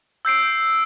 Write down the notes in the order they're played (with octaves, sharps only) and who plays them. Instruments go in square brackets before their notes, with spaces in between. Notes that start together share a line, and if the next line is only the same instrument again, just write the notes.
[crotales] E6 G6 C7 D7